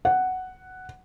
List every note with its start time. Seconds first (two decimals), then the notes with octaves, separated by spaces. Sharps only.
0.05 F#5